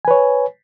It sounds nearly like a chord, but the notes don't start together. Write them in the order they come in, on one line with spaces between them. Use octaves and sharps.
G#5 B4 C#5